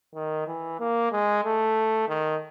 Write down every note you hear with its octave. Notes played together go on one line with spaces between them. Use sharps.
D#3
E3
A#3
G#3
A3
D#3